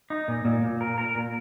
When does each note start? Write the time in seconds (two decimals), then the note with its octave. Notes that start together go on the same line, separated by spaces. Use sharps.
0.10 D#4
0.28 A#2
0.45 A#2
0.63 A#2
0.81 A#4
0.98 A#4
1.15 A#2